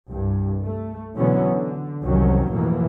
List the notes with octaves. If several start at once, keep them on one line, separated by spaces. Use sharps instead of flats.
C2 G2
A3
B2 D3 E3 F#3 B3 C#4
D3
C2 F2 C3 D#3 F#3 C#4
A1 F2 B2 E3 A#3